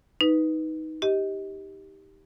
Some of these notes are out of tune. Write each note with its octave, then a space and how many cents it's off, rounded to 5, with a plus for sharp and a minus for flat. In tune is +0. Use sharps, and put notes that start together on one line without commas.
D#4 +15 B4 +5
G4 +0 D#5 +20